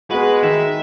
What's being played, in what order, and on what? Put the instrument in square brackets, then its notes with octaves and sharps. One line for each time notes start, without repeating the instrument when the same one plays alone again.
[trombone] G#3 [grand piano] B3 F#4 [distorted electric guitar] B4
[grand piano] D#3 [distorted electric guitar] E5